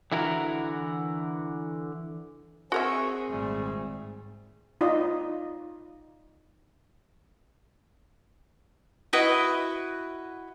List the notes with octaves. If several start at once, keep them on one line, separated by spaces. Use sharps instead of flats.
D3 E3 E4 F#4 A#4
C4 F#4 G#4 A#4 E5 G#5 C#6
G#1 A#2 G3 A3
D#4 F4 D5 D#5
E4 F#4 B4 D#5